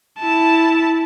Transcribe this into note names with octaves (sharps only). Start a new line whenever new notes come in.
E4 A5